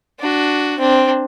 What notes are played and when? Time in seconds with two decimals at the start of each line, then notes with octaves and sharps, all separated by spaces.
0.20 D4 F#4
0.78 C4 D4